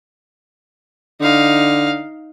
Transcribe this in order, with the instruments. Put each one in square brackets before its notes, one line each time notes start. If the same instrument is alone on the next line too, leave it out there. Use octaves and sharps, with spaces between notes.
[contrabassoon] D3 [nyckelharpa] D#4 F5